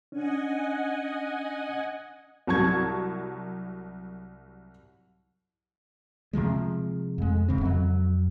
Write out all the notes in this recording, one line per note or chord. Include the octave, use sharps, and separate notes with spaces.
C#4 D4 D#5 F#5 G#5
C2 F#3 A5 C#6 G#6
C3 D#3 F3 G#3
F2 G#3
D1 C#3 C4
F2 F#3